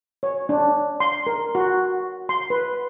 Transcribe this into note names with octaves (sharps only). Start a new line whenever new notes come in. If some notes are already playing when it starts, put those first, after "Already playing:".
C#5
D4
C6
A#4
F#4
C6
B4